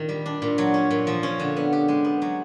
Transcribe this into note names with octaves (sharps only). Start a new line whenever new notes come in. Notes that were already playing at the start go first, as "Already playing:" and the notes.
Already playing: A#2 D#3 C4
G3
D4
A#2
F#3
C#4
A#2
F3
C#4
D3
B3
G4
G#3
B3
F#3